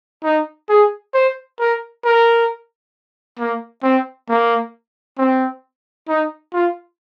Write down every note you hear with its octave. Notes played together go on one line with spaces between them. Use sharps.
D#4
G#4
C5
A#4
A#4
A#3
C4
A#3
C4
D#4
F4